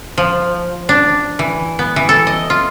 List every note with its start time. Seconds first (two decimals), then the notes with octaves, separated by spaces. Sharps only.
0.18 F3
0.89 D4
1.39 E3
1.79 B3
1.96 E3
2.09 A4
2.27 D#5
2.50 F4